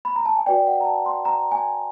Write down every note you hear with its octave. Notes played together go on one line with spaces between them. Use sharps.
B5
A#5
A5
G#5
F#4 B4 D5 G5
F#5
A#5
A5
C6
A#5
G#5